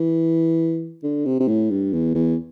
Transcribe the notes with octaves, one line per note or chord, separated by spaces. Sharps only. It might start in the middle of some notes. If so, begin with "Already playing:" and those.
Already playing: E3
D3
C3
C3
A2
G2
E2
E2